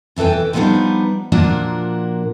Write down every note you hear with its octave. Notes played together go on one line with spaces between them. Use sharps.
B2 E3 A4 B4 G5
D3 F3 G3 B3 D4 D#4
A#2 F3 A#3 D4 F#4 A#4